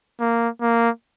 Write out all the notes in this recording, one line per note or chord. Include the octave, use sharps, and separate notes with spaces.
A#3
A#3